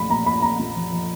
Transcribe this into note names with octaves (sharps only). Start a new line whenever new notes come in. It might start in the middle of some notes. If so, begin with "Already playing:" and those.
Already playing: A#1 A3 B5
A#2 A#5
A#2 B5
A#2 A#5
A#1
F3
F3